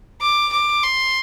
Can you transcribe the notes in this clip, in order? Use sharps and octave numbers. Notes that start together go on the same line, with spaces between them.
D6
D6
C6